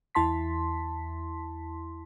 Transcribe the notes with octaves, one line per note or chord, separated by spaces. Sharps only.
E2 E4 A5 C6 B6